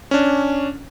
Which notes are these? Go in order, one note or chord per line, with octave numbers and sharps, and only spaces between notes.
C#4 D4